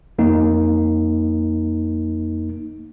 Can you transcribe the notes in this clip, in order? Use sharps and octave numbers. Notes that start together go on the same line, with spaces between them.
F2 A#3 D#4